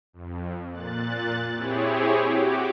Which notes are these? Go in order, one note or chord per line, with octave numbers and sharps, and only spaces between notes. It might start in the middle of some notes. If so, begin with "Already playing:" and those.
F2
A#2 F#6 A6
C4 E4 G4 G#4 C#5
F#4 G4 D6